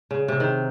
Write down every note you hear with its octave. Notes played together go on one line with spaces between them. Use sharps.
C#3
C3
D#3